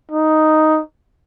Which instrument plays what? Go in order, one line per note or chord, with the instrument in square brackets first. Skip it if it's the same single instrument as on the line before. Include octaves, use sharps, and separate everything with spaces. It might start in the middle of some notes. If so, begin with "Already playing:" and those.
[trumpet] D#4